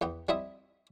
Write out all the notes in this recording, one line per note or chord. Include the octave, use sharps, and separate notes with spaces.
E2 B3 G5
G3 C4 E4 D#5 E5 D#6